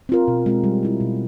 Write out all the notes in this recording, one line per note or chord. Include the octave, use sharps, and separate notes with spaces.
C4 F4 A#4
B2
G#3 C4 F4
G3
C4 E4
B2